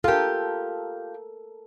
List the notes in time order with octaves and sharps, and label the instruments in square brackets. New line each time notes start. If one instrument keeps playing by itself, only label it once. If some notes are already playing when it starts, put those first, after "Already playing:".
[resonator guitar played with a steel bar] F4 G4 [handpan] A4 A#4